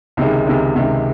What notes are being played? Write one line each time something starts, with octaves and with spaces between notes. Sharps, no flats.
C#2 C3 D#3 G#3
C#2 C3 D#3 G#3
C#2 C3 D#3 G#3